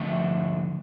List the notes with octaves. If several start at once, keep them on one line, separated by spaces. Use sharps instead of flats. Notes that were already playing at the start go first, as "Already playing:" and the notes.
Already playing: D2 D3 F3 A3 E5